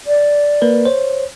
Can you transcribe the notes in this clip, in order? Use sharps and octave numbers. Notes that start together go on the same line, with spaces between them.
D5
A#3 A#4 B4
C5 C#5